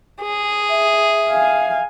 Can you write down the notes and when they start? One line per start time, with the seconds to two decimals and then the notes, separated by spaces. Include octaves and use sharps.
0.22 G#4
0.70 E5
1.29 F5 G#5